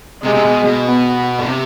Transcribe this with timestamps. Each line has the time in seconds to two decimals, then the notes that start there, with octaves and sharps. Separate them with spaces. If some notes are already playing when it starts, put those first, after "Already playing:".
0.24 C3 G#3
0.35 C3
0.44 B2
0.65 B2
0.85 B3
1.39 D3
1.46 C3